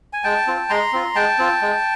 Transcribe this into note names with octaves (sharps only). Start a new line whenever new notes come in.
G#5
G#3 G5 A5
C4 F4
G#3 A#5 C6
C4 F4
G#3 G5 A5
C4 F4
G#3